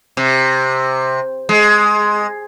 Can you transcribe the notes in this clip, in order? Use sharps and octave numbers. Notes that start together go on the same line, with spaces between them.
C3
G#3